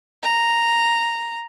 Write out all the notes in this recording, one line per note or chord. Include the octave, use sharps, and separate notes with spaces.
A#5